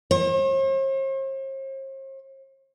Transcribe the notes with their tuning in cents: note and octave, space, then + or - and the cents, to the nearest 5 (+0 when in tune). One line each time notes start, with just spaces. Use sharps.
C5 +45